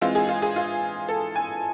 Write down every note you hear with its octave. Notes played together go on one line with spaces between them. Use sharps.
E3 G#3 C4 F4
G#4
F4
G#4
F4
A4
G#5